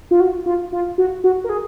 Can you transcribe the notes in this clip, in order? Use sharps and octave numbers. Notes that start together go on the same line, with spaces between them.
F4
F#4
F4
F4
F#4
F#4
A#4
G#4